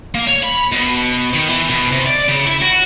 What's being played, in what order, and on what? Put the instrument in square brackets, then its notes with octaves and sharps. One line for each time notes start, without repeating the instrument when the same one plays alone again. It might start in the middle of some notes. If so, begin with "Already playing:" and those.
[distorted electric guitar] A#3
C#5
B5
B2
D#3
E3
B2
C3
D5
C#3
E4
F#4